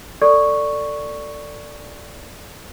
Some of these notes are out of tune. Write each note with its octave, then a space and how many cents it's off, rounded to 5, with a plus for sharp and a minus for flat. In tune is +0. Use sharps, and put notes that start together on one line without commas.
A4 +25 D5 +0 C#6 +0